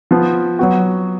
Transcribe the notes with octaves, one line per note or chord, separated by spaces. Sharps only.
F3 B3 F4
F#3 B3 F#4